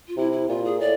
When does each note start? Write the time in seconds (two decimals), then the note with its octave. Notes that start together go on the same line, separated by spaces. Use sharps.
0.08 F4
0.17 C3 E4
0.32 E4
0.49 A#2 F4
0.65 G#4
0.79 A2 D5